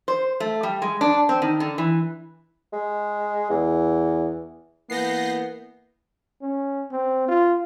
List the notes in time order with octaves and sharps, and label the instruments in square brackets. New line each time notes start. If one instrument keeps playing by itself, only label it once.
[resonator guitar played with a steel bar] C5
A3
G3
G#3
D4
C4
D#3
D3
E3
[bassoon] G#3
E2
[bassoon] E3 [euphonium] A#3 [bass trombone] B3 [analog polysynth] G6 A#6 C7
[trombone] C#4
C4
F4